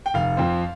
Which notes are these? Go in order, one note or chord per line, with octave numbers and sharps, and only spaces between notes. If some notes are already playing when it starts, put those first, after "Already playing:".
G5
F1 F5
F2 F3 C4